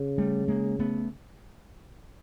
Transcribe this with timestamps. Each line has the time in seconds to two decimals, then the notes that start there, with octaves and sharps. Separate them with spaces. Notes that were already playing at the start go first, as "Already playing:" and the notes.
Already playing: C#3
0.18 G3 A3
0.48 G#3 A#3
0.79 A3 B3